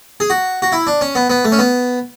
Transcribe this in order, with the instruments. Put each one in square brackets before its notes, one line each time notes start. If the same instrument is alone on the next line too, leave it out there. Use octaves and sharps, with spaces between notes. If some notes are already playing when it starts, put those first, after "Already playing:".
[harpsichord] G#4
F#4
F#4
E4
D4
C#4
B3
B3
A3
C#4
B3